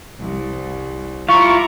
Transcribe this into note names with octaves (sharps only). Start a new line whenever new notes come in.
C2
E4 F4 F5 A#5 C#6 D6